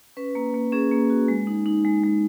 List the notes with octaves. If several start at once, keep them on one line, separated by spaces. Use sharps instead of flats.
C#4 B4
A#3
A#3
C#4 G#4
A#3
F#4
G#3
D#4
D#4
G#3
G#3